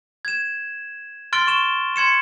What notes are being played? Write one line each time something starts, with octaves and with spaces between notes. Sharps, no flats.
G#6 E7
C6 F6 A6 D7 G7
C#6 E7 G7
C6 G#6 C#7 E7